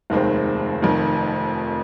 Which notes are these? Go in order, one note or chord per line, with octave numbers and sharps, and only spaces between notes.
F1 D#2 D#3 G#3 C4
F1 F2 D#3